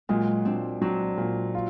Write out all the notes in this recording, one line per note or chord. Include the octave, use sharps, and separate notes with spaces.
A#2 F#3 G#3
A#2 C4 D4
F#3 C4 D4
A#2
F4